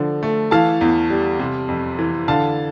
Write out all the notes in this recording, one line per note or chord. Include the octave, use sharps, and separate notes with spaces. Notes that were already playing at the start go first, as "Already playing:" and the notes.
Already playing: D3 F3
A3
E3 F5 A5
E2
G3
C3
F2
E3
D3 F5 A5